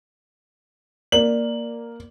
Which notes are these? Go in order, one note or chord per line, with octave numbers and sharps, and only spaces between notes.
A#3 D5 F#7